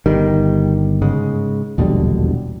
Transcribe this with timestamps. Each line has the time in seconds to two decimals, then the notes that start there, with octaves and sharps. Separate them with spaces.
0.06 G1 D#3 G3
1.02 G#2 C#3 G#3
1.78 E1 A#1 D#2 B2 D3 G3